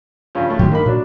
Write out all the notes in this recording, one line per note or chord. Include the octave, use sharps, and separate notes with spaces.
G2 C#3 F3
A3 C#4
A2 D#3 F#3 G4 C6
G2 A#3 D#4 B5
A#2 F#3 D4